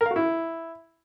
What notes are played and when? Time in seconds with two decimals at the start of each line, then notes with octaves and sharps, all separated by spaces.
0.01 A#4
0.06 F5
0.11 F#4
0.16 E4